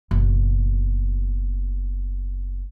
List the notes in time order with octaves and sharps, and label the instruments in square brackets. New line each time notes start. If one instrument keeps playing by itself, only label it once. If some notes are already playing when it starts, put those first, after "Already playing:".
[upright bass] F#1 B2